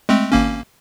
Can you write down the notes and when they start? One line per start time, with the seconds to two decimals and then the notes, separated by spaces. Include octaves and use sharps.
0.09 G#3 A3 C4
0.32 G#1 A#3 C#4